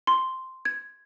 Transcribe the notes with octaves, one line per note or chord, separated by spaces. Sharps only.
C6
G#6